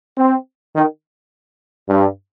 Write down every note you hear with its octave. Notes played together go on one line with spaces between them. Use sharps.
C4
D#3
G2